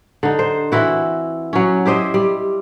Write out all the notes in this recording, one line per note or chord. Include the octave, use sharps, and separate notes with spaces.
D3 D#4
C5
E3 C4 E4 F#4
F#3 C#4
E4 G4 C5 D#5
G3